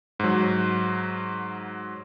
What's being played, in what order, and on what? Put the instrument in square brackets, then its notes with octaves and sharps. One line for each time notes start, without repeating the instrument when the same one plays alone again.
[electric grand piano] G#2 F#3